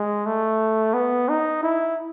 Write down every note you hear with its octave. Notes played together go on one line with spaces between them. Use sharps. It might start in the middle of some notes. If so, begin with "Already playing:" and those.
Already playing: G#3
A3
B3
D#4
E4